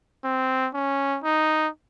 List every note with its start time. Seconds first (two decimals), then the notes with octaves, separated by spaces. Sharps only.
0.24 C4
0.74 C#4
1.24 D#4